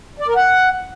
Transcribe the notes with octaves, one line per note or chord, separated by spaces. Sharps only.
D5
A#4
F#5